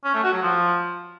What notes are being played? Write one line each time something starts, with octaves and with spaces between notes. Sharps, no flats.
C#4
A3
F#4
F#3
F3